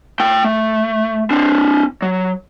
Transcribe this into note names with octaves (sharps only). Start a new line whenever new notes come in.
A3 G5
A3
C4 D4
F#3